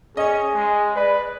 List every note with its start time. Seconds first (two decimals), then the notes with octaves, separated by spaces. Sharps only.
0.17 C#4 G#4 D#5
0.55 G#3
0.96 B4 D5